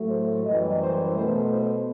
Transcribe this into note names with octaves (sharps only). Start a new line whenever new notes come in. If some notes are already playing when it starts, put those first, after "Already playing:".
Already playing: A2 F#3 A3
C5
F#2 E3 G3 D#5
C5
B2 A3 C5
C5